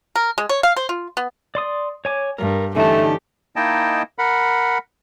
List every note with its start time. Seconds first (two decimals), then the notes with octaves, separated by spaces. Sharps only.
0.16 A#4
0.38 G#3
0.49 C#5
0.63 F5
0.76 C5
0.89 F4
1.17 B3
1.55 D5 C6 D#6
2.05 C#5 G#5 D6
2.38 G2 A#4
2.76 D3 E3 A3 C#4 D#4 G4 A5
3.56 A#3 D#4 E4 D#5 G5 A5
4.19 A#4 F#5 B5